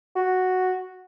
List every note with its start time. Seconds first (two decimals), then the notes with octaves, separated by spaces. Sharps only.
0.16 F#4